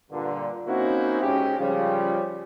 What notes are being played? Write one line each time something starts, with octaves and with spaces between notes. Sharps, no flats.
G2 A#2 D3
A#3 C4 C#4 D#4 E4 F#4
G#2 C#4 G4
C#3 F3 G3